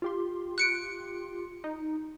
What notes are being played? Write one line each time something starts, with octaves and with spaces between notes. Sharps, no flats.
F4 G4 C6
F#6 C#7 D7
D#4